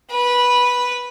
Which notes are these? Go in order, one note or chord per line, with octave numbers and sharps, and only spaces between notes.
B4